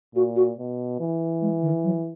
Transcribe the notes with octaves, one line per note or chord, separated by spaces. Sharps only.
A#2 F#4
F#4
B2
E3
G#3
D#3
F#3